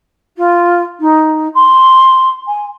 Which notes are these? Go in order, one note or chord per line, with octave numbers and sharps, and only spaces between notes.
F4
D#4
C6
G#5